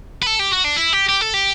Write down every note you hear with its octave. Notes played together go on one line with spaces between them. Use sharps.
B4
A4
G4
F#4
D4
E4
G4
G4
A4
G4